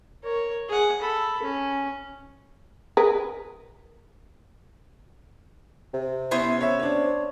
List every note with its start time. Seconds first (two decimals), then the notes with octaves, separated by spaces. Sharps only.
0.23 A#4 C#5
0.69 G#4 F#5
1.02 A4 B5
1.43 C#4
2.97 G#4 A#4 B4
5.94 C3
6.31 B3 C#4 E4 C5
6.61 C#5 E5
6.79 D4 C#5